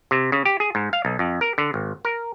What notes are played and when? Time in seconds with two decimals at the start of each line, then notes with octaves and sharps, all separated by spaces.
0.11 C3
0.32 C#3
0.45 G4
0.60 G#4
0.75 G#2
0.93 F5
1.05 B1
1.19 F2
1.41 A#4
1.58 D3
1.74 G#1
2.05 A#4